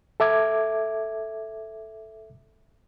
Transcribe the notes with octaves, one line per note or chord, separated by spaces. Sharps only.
A4 E5 D6 G#6